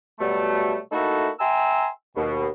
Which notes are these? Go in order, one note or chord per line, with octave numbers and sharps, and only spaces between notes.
B2 F#3 G3 A3
A3 A#3 D#4 E4 F#4 A4
E5 G5 G#5 A#5 C6 E6
D#2 B2